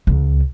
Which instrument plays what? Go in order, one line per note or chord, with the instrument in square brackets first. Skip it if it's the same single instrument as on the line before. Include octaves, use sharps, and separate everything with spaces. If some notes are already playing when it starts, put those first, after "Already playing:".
[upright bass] C#2